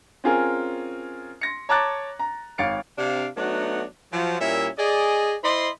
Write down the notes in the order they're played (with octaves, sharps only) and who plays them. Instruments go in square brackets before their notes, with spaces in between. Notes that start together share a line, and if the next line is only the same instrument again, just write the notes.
[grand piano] C4 C#4 F4 G#4 A#4
C6 A#6 C#7
C#5 A5 A#5 D6 F#6 A6
A#5
G#1 C#5 F5 A6 C#7 D7
[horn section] C3 D4 F5
F#3 A3 B3 D4 D#4 F#4
F3 F#3
A#2 G3 C#4 E4 A#4 E5
G#4 D5 D#5
E4 C5 D#5 B5 C6